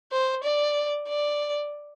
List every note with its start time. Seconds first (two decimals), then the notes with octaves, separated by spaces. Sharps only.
0.12 C5
0.44 D5
1.08 D5